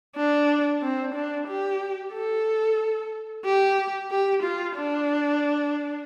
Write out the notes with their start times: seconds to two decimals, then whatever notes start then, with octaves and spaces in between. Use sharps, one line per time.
0.17 D4
0.82 C4
1.15 D4
1.48 G4
2.13 A4
3.45 G4
4.10 G4
4.43 F4
4.76 D4